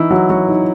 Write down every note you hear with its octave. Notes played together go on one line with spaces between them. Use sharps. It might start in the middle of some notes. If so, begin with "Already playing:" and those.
Already playing: E3 D#4 E4
F#3 F#4
F#3 F#4
D#4